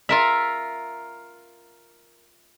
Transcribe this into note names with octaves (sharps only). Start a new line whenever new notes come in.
F4 A#4 E5